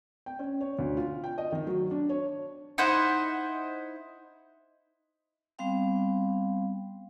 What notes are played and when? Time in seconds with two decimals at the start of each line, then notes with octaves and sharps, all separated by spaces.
0.26 G5
0.39 C#4
0.61 C#5
0.79 D2
0.97 F4
1.24 G5
1.38 D#5
1.52 D#3
1.67 F#3
1.91 D4
2.09 C#5
2.78 D#4 E4 C5 F#5
5.59 G3 B3 C4 F5 G5